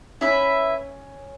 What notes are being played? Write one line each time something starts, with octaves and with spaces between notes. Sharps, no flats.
C#4 E4 B4 E5